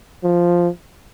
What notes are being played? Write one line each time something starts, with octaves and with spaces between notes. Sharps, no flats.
F3